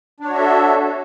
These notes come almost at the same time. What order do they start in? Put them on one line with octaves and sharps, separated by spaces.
D4 C#5 F#4 E5 A4